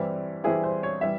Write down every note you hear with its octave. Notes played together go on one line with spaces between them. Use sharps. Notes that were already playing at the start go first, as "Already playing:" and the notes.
Already playing: G2 E3 G3 C4 E4
G2 E3 G3 C4 E4 G#4
C5
C#5
E3 G3 E5